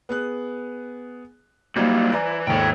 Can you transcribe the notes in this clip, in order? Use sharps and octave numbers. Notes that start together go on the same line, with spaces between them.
B3 G#4 F#6
B1 F#3 G3 A#3 D#4
E3 D5 G#5 A#5
D#2 G#2 A4 G5